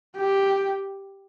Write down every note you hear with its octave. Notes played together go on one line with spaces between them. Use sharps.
G4